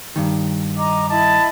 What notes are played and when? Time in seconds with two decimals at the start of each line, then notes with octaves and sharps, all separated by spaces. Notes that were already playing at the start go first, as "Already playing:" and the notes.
0.16 G2 D#3
0.77 D#5 A#5 D6
1.10 E4 D#5 A5 B5